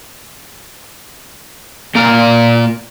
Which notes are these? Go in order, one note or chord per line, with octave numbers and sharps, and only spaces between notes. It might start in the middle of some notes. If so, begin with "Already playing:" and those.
A#2 A#4